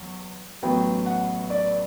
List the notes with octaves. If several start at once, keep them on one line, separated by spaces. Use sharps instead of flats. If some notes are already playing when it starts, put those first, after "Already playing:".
Already playing: E2 F#3
A1 A2 F#3 B3 G5
F#5
D5